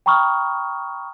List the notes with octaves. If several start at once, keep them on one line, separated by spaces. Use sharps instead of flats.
G5 A#5 B5 C#6 D#6 F6